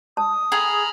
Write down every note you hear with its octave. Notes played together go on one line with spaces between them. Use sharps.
A5 D#6
G#4 A#5 B5 F6